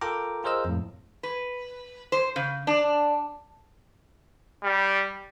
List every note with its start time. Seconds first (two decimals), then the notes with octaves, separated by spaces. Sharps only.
0.01 F4 A4 A#4 G5 A#5 D6
0.44 F4 G#4 A#4 C5 D#5 E6
0.65 F2 A2
1.23 B4
2.12 C5
2.36 C#3
2.67 D4
4.64 G3